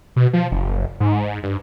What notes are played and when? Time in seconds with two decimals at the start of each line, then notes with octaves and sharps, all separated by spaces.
0.16 B2
0.33 F3
0.51 F#1
1.00 G#2
1.43 G2